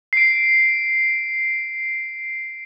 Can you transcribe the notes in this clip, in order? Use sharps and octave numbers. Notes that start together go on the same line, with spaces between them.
C7 D7